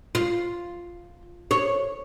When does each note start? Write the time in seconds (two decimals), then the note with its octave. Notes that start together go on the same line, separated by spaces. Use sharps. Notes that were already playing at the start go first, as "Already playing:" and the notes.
0.15 F4
1.51 C#5